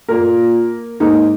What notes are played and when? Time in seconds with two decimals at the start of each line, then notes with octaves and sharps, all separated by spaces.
0.09 A#2 A#3 A#4
1.00 G#2 A#3 D#4